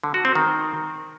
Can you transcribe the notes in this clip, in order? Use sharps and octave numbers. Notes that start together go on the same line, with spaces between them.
D3
F#4
C4
D#3